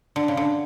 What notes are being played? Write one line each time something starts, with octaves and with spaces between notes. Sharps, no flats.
D3
C#3
D3